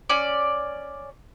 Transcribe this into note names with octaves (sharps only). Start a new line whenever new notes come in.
C#4 D5